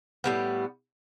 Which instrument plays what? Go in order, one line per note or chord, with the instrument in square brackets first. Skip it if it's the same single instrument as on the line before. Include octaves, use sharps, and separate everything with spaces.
[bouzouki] A2 G3 B3